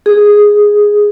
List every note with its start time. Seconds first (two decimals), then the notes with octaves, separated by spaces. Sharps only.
0.06 G#4